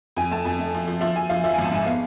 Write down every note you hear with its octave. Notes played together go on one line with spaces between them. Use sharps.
F2 G#5
A3 A5
F2 G#5
A3
F3
F3
F3 E5
F3 G#5
F3 F5
F3 E5
G#1 G#5
A5
G#2 G#5
B3 F5